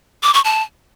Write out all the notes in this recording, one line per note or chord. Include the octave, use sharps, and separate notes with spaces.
D6
C#6
A5